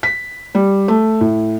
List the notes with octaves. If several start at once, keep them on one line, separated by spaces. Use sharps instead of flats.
B6
G3
A3
A2